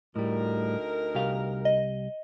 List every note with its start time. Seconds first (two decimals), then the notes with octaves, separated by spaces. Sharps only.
0.16 D2 A2 G3 D#4 A#4
1.15 C2 G4 F5
1.65 D#5